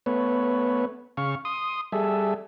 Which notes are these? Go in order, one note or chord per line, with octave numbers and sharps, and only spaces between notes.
A3 B3 B4 C#5
C#3 F5 C#6
C6 D#6
G3 G#4 A4 E5